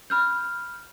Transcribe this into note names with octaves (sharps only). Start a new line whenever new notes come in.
B5 F6 G6